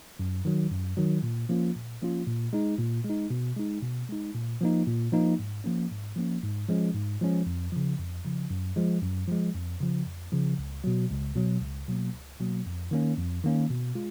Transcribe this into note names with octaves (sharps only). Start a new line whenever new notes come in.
F#2
D#3 F#3
F#2
D#3 F#3
A#2
F3 A#3 C#4 F4
A#2
F3 A#3 C#4 F4
A#2
G#3 D#4
A#2
G#3
D#4
B2
G#3 D#4
B2
G#3 D#4
A#2
F3 A#3 D#4
A#2
F3 A#3 D#4
G#2
F3 A#3 C#4
G#2
F3 A#3 C#4
G#2
F3 G#3 C#4
G#2
F3 G#3 C#4
F2
C#3 F3
F2
C#3 F3
F#2
F3 G#3
F#2
F3 G#3
F2
C#3 F3
F2
C#3 F3
C#2
B2 F#3
C#2
B2 F#3
C#2
B2 F#3 A#3
C#2
B2 F#3 A#3
F2
D#3 A#3 C#4
F2
D#3 A#3 C#4
B2
G#3 F4